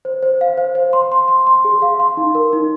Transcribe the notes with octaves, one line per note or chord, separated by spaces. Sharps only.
C5
C5
F5
C5
C5
C6
C6
C6
C6
G#4
F5
C6
D#4
A#4
D#4